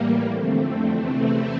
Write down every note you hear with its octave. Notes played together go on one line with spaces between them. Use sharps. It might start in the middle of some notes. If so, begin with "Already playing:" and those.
Already playing: A2 E3 G3 A#3
F2 D3 A3 C4
E2 C3 E3